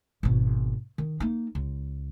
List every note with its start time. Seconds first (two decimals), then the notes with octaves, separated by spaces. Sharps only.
0.23 G#1 B2
0.98 D#3
1.20 A#3 D#4
1.55 C#2